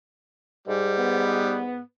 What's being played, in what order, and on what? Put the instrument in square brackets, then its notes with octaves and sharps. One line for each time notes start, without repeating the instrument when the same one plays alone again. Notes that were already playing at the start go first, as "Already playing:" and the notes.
[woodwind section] G#2 [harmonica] G3
[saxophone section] B3